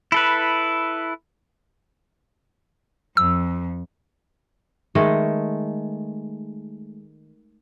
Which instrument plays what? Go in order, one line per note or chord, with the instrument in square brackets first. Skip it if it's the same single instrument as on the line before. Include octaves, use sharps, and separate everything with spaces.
[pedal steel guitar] E4 A4 B4
[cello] F2 [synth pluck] E6
[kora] D#3 G#3 A3